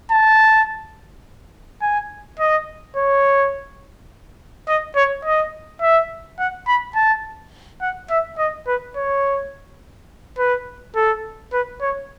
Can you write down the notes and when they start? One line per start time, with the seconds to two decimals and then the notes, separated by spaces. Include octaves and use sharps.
0.11 A5
1.82 G#5
2.40 D#5
2.96 C#5
4.68 D#5
4.96 C#5
5.25 D#5
5.82 E5
6.39 F#5
6.68 B5
6.96 A5
7.82 F#5
8.10 E5
8.38 D#5
8.67 B4
8.97 C#5
10.38 B4
10.96 A4
11.53 B4
11.81 C#5